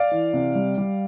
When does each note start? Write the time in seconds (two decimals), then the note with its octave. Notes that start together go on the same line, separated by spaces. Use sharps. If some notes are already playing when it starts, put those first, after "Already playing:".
Already playing: D5 F5
0.11 E3
0.33 C3
0.55 G3
0.78 G3